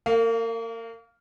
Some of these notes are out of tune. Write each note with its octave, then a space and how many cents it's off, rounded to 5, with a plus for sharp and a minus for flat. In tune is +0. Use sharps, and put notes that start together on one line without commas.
A#3 -35 F5 +0